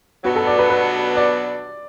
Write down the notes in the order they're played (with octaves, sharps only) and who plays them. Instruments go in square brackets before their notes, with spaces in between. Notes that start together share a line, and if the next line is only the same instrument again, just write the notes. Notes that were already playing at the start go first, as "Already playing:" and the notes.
[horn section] B2 F#3 B3 D4 [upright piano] F#4
[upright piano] A4
D5
B4
B4
D5